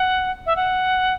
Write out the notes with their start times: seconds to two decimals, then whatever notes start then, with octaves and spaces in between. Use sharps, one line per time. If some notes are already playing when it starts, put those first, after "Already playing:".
Already playing: F#5
0.46 E5
0.56 F#5